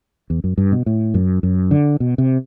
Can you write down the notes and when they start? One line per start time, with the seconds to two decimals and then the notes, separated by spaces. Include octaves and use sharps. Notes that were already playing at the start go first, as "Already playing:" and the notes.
0.30 E2
0.44 F#2
0.58 G2
0.72 B2
0.86 A2
1.14 F#2
1.43 F#2
1.71 D3
2.00 B2
2.18 C3